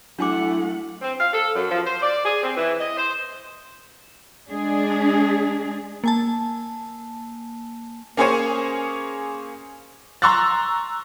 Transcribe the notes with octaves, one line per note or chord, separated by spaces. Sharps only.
F#3 A3 D4 E4 F#5 G#5 D6
C4
F5
A4
F#2
F3
C5
D5
G#4
C4
E3
D#5
C5
G#3 D4 G#4
A#3 G#5 A5
A#3 C#4 G#4 C5 C#5 G#5
A#5 C6 C#6 E6 F#6 A6